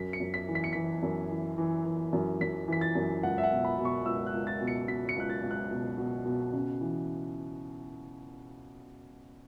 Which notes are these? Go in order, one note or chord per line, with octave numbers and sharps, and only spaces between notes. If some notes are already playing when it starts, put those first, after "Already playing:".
Already playing: F#2 B6
C#7
F#2
B6
E3
B6
C#7
E3 B6
F#2
E3
E3
E3
F#2
F#2 B6
E3 B6
A6
F#2
C#2 F#5
E5
F#5
B2
B5
B2
C#6
C#2 E6
F#6
C#2
A6
B2
C#7
B2 B6
C#7
C#2 F#6
A6
C#2
F#6
B2
B2
B2
C#3
E3